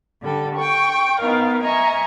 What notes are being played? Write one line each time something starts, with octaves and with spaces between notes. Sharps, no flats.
D3 G3 A4
G5 C#6
B3 D#4 A#4 F5
D#5 E5 G#5 A#5 C#6